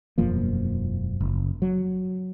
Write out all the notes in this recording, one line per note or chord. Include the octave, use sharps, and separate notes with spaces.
E1 F#2 F3 A#3
F#1
F#3